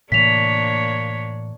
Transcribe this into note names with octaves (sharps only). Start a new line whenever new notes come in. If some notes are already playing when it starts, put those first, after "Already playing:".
A2 C3 E3 A#3 D4 C#5 B6 F7